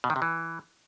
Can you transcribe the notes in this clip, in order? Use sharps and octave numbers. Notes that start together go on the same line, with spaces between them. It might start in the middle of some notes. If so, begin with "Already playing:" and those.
B2
D#3
C3
E3